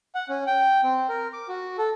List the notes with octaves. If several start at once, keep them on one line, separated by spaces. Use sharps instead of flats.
F#5
C#4
G5
C4
A#4
D6
F#4
A4